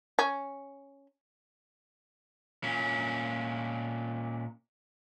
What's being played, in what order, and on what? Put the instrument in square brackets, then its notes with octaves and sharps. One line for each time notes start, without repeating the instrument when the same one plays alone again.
[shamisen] C#4
[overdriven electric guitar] A#2 C#4